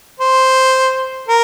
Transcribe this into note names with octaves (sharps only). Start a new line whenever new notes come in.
C5
A#4